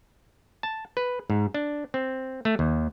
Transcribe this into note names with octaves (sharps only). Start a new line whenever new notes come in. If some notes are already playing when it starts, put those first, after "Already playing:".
A5
B4
G#2
D4
C4
A3
D#2